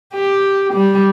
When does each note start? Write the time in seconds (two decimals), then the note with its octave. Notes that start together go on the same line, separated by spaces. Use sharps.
0.13 G4
0.74 G3